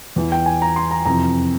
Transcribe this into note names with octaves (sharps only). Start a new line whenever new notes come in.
E2 E3
G5
G#5
A#5
C6
A#5
F2 C3 E3 A#5